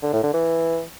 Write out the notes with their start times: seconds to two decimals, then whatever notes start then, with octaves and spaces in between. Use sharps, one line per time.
0.03 D3
0.13 A2
0.23 D3
0.34 E3